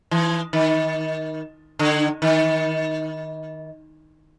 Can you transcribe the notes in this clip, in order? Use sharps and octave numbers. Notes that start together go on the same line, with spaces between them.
E3
D#3
D3
D#3